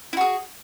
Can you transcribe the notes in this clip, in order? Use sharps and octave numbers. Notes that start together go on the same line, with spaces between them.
E4 F#4 G#4